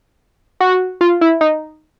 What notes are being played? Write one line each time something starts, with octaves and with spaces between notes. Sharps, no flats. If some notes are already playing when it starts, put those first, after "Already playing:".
F#4
F4
E4
D#4